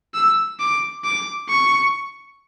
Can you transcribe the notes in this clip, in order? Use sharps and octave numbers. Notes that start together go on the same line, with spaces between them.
E6
D6
D6
C#6